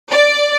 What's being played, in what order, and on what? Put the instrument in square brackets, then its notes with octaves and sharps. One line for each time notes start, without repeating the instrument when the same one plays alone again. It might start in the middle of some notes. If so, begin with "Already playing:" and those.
[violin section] D5